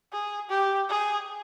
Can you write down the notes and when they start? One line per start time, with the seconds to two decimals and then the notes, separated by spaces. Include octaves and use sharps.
0.12 G#4
0.50 G4
0.89 G#4